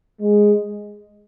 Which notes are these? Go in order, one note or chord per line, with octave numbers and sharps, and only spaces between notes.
G#3